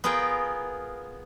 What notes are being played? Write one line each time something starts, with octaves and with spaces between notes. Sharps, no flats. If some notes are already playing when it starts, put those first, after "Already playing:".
B3 F4 G#4 A#4 G5